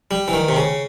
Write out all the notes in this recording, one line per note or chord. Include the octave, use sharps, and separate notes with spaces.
G3
E3
D#3
C3
C#3